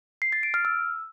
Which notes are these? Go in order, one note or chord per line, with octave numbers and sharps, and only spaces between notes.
C7
A6
D7
F6
E6